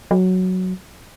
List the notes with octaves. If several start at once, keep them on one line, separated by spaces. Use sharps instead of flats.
F#3